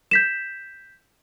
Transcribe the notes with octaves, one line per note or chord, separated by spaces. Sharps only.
G6 B6 E7